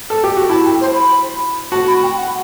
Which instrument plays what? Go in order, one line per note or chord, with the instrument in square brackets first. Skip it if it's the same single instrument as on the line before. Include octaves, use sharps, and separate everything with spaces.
[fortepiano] A4
G4
F#4
[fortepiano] E4 [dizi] A5
[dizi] G5
C5
B5
[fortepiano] F#4 [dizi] A5
[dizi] B5
G5
F#5